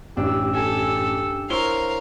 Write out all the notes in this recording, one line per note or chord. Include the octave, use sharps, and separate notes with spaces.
A1 F#2 D4 G4 E6
A4 G#5
E4 A#4 C5 C#5 F5 G7